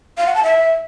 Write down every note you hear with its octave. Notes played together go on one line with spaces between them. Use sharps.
F5
F#5
A5
E5